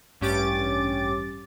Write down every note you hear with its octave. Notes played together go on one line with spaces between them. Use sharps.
A1 G2 C#4 G4 D6 A6